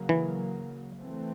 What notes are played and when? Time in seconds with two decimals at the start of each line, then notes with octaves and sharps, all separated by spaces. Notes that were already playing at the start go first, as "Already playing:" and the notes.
Already playing: C#3 F#3 A#3
0.09 E3
0.98 E3 A3 C4